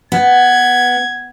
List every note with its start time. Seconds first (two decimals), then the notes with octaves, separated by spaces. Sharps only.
0.12 B3 G#6